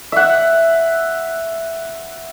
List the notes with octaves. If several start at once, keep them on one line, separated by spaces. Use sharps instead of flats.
E5 F#5